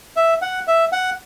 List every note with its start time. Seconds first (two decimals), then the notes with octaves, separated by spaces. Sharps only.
0.16 E5
0.42 F#5
0.68 E5
0.92 F#5